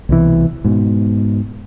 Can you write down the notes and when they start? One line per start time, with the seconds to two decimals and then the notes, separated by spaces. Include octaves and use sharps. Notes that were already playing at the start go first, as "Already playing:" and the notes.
0.09 C2 B2 D#3 E3
0.64 G#2 B2